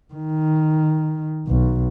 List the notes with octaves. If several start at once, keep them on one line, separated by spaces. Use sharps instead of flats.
D#3
B1